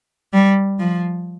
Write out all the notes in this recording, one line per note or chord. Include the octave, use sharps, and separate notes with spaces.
G3
F3